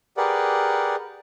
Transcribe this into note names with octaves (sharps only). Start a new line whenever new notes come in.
G4 G#4 A#4 B4 D5 F#5